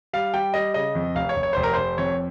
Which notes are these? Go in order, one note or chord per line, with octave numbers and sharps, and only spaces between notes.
G3 F5
G3 G5
G3 D#5
C#3 D#5
F2
F1 F5
C#5
F1
C#5
F1 C5
A#4
F1 C5
F2 C#5